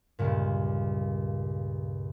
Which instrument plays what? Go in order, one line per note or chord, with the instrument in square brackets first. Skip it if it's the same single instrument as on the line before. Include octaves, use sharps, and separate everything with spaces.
[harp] C#2 G2 A#2